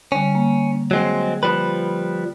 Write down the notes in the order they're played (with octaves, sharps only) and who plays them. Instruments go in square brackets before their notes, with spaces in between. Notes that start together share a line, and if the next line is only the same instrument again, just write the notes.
[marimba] D3 G3 [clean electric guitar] C#4
[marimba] A#3
[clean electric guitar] F#3 G#3 C4
F3 G3 B4